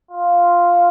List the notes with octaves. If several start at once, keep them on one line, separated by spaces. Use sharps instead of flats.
F4